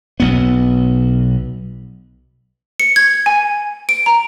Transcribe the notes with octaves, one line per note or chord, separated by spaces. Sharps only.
B1 B3
C#7
G#6
G#5
D7
A#5